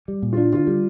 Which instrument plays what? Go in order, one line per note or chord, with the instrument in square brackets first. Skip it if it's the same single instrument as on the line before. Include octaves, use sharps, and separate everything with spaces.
[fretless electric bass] G3
A#2
[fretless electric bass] D4 [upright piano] F4
[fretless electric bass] D3 [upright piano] F4
[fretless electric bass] G3